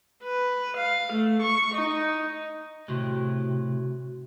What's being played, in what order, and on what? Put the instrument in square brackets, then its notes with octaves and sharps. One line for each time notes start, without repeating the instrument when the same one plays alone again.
[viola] B4
F5
A3
C#6
D#4
[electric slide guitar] A2 C3 [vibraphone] F#4